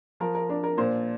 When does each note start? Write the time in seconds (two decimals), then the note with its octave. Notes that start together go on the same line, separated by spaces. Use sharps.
0.20 F3 A#4
0.35 A#4
0.49 D4 A#4
0.63 A#4
0.77 A#2 C5